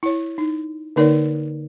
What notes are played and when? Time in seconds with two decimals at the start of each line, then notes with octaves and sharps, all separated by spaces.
0.03 E4 C#5
0.38 D#4
0.96 D3 A#3 D#4 A#4 C#5 D5